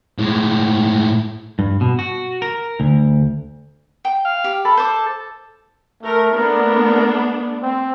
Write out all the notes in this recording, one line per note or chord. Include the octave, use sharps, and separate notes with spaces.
A2 G#3
G2
B2
F#4
A#4
D2
G5
F5
G4
A4 B5
C5 D6
A3 A#4
A3 B3 D4 A#4
C4